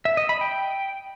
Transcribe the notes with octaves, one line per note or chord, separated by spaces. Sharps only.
E5
D#5
B5
G5